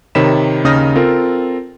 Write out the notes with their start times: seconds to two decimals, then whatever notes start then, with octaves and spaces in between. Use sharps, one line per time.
0.15 C3 D#3 C#5 B5 B6 E7
0.64 D#2 C#3 D#4 D#6 F6 A#6
0.96 C4 F4 A4 A#4